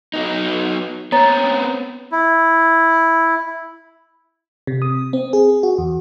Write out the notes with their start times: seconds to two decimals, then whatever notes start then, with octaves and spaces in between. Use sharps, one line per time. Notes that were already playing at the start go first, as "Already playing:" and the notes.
0.14 F#3 B3 D#4
1.12 B3 C4 C#5 A#5 A6
2.12 E4
4.67 C3
4.82 D#6
5.13 C4
5.33 G#4
5.63 F#4
5.78 E2